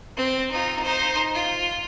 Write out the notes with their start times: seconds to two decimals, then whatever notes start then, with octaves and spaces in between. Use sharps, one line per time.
0.17 C4
0.51 D#4 F4
0.83 D#4 C5
1.35 F4